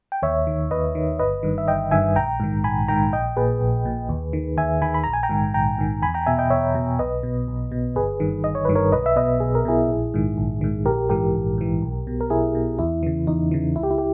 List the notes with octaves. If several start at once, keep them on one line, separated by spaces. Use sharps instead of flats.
G5
D#2 C#5 E5
D#3
D#2 B4 D#5
D#3
G1 B4 D#5
G2 D#3
E5
G1 D#5 G5
G2 D#3 E5 G#5
A#1 G5 A#5
G#2 D#3
A#1 G#5 B5
G#2 D#3 G5 A#5
A#1 D#5 G5
A#2 G#4 B4
A#1
A#2
D#2
D#3
D#2 E5 G#5
D#3 G#5 B5
B5
A#1 A#5
G#5
G5 A#5
G#2 D#3
A#1 G5 A#5
G#2 D#3
E2 G#5 B5
G5 A#5
B2 E5 G#5
D#5 G5
E2 C#5 E5
B2
B1 B4 D#5
B2
B1
B2
G1 G#4 B4
G2 D#3
G1 D#5
C#5
G2 D#3 B4
A#4 C#5
B1 B4 D#5
E5
B2 B4 D#5
B1 G#4
A#4
B2 E4 G#4
A#1
G#2 D#3
A#1
G#2 D#3
A#1 G4 A#4
G#2 E3 G4 A#4
A#1
G#2 E3
B1
B2
A#4
B1 E4 G#4
B2
E2 E4
C#3 E3
E2 D#4
C#3 E3
C#2 E4
G4
E4
G4